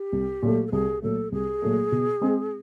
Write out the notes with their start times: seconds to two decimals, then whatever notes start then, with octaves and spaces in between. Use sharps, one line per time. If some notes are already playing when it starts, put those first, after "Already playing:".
Already playing: G4
0.12 C2
0.42 A#2 F#3 A3
0.67 A4
0.72 C2 G#4
1.02 A#2 F#3 A3 A4
1.32 C2 G#4
1.62 A#2 F#3 A3
1.92 B2
2.21 G#3 C4